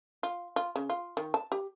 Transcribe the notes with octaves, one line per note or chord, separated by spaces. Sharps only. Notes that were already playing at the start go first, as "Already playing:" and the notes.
F4
F4
C#3
F4
D#3
A5
G4